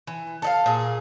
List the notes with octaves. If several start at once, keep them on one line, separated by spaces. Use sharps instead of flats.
E3
A4 D#5 F5
A#2 G#4